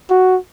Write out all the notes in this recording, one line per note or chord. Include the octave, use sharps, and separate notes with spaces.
F#4